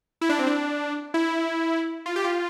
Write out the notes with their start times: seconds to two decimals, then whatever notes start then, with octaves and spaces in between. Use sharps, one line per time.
0.21 E4
0.29 D4
0.39 C4
0.47 D4
1.14 E4
2.06 F4
2.16 G4
2.24 F4